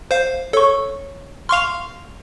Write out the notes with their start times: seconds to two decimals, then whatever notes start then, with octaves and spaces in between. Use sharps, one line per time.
0.11 C5 F5
0.53 A4 C#5 C#6
1.49 F5 C6 C#6 F6 F7